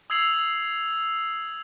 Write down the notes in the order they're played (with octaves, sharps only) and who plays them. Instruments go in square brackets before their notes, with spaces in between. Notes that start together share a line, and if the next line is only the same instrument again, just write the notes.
[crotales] D#6 E6 G#6 C7 F7 F#7